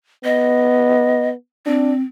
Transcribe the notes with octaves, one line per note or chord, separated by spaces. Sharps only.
B3 D#5
C4 D4